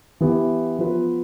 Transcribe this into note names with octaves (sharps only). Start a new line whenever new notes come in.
E3 B3 E4 G4
F3 B3 F4 B4